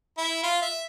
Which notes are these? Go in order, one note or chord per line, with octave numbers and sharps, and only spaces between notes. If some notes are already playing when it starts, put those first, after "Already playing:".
E4
F4
E5